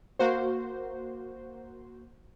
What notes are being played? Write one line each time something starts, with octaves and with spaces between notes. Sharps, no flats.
A#3 F#4 C5